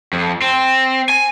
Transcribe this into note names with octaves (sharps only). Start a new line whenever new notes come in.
F2
C4
G#5